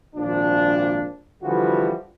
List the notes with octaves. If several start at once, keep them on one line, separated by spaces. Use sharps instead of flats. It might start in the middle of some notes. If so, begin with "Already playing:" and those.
G#1 A#2 F3 D4
D3 E3 F3 G3 F4 F#4